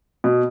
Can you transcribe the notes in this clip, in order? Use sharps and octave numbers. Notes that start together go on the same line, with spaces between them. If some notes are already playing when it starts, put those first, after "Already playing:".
B2